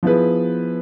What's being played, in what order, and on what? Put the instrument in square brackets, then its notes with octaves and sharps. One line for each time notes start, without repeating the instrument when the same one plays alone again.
[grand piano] F3 B3 E4 G#4 B4